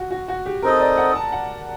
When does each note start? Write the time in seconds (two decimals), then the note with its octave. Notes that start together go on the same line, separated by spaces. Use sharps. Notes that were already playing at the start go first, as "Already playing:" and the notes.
Already playing: F#4
0.11 F#4
0.28 F#4
0.46 G4
0.62 C4 D#4 A4 A#4 D#5
0.80 D5
0.97 F#5
1.15 A5
1.32 F#5